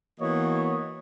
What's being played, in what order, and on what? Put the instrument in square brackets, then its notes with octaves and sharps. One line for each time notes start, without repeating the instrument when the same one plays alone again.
[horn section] E3 A#3 B3 F#4 C#5 D#5